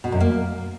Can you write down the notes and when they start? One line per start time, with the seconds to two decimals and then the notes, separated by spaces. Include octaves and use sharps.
0.04 B2
0.12 F#2
0.21 A#3